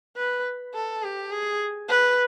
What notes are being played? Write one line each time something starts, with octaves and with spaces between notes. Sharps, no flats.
B4
A4
G4
G#4
B4